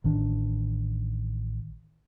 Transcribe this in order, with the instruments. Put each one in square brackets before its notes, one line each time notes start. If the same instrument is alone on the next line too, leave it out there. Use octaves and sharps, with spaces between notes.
[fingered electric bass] A1 D#3 D4